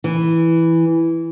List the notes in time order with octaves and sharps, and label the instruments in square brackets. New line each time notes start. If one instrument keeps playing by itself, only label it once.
[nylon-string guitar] E3